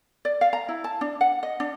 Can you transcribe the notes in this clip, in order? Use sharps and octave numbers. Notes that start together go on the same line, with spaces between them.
D5
F5
A#5
E4
A5
D4
F#5
D#5
D4